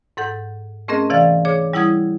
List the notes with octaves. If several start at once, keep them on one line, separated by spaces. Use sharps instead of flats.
G#2 A4 F#5 G6
A3 C4 C#4 G#4 A#4 D#5
C3 E3 D5 F5 A6
G#4 C#5 D6
G3 E4 F#5 D#6 G#6